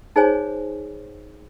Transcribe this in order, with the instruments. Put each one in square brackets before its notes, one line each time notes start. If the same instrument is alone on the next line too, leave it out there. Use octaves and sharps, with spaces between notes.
[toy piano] D#4 G#4 C5 C#5 G#5